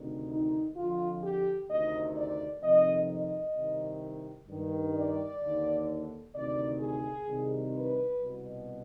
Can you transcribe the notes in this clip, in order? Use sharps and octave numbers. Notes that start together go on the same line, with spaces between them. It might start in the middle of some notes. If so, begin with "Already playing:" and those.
Already playing: D2 C3 D#3
D#4
F2 D3 F4
G4
D2 C3 D#3 D#5
D5
F2 C3 D#3 D#5
D#5
C2 C3 D#3
G2 D#3
D5
D#2 D3
D2 C3 D#3 D5
G#4
C2 C3 D#3
B4
C2 B2